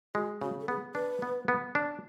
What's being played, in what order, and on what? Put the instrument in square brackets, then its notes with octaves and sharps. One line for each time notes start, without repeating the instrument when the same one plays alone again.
[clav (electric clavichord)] G#3 [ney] F#4
[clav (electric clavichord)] C#3 [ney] F#4
[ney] A4
[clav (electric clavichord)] B3 [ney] G#4
[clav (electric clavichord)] D4 [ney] B4
[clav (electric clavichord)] B3
B3
D4